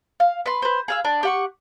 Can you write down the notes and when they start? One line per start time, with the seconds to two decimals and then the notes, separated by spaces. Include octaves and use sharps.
0.20 F5
0.46 B4 C6
0.62 B4 C5
0.88 G#4 F5 E6
1.05 D4
1.23 G4 F#5 C#6